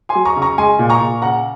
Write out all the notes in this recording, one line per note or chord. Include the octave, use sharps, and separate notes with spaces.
G#5 C6
F#3
A#5 C#6
C#3
A#5 C#6
G#3 G#5 C6
A#2
A#5 C#6
A#2
C#3 F#5 A#5